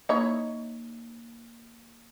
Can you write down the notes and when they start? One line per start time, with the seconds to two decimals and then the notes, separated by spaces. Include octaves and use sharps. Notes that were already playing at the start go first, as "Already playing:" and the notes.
0.09 A#3 D#4 E4 C#5